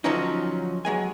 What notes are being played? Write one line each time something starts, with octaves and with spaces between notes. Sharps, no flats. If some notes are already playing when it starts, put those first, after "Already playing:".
D3 F3 F#3 C#4 D#4
F#3 G#3 G#5